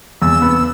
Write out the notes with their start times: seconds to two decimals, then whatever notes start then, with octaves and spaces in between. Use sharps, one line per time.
0.22 E2 E6
0.42 B3